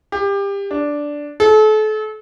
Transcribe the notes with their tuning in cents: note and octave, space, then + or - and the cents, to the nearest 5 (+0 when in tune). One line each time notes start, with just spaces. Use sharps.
G4 +25
D4 -5
A4 -35